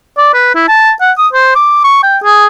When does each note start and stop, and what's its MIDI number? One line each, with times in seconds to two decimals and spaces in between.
0.18 0.32 74
0.34 0.51 71
0.55 0.66 64
0.68 0.92 81
1.01 1.12 78
1.18 1.28 87
1.33 1.54 72
1.55 1.81 86
1.84 2.02 85
2.03 2.18 79
2.24 2.46 68